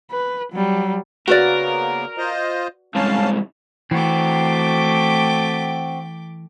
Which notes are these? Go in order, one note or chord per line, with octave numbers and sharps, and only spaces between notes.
B4
F#3 G3
C#3 A#3 B3 F#4 A#4 B4 D5
F4 C5 D#5
C2 G#2 C#4 F5 A5
E3 A3 C4 F#4 G5 D6